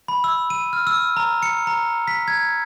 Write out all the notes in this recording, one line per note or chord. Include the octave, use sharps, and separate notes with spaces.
B5
E6
D#7
F6
E6
A#5
C#7
A#5
B6
G#6